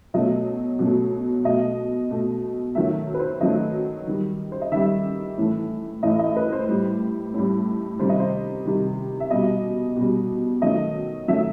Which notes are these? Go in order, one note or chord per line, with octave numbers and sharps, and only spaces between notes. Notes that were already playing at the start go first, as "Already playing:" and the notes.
B2 F#3 A3 D#5
B2 F#3 A3
B2 A3 D#5
B2 A3
D#3 F#3 A3 E5
B4
C5
D#3 F#3 A3 D#5
D#3 G3
C5
D#5
D#3 G3 E5
A2 E3 A3
A2 E3 A3 D#5
D#5
B4
C5
A2 G3
A2 G3
C3 D#3 G3 C5
D#5
C5
C3 D#3 G3
E5
B2 G3 D#5
B2 G3
D#3 F#3 A3 D#5
D#3 F#3 A3 E5